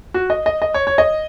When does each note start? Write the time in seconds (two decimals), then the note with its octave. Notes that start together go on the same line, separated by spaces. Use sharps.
0.14 F#4
0.30 D#5
0.46 D#5
0.62 D#5
0.74 C#5
0.87 C#5
0.98 D#5